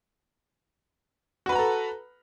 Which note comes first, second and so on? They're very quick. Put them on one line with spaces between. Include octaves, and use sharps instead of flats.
F#4 B4 B5 A#5 A4